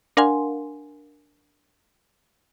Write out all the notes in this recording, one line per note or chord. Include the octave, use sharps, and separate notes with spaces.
D4 A#4 F5 F#5 G#5 C6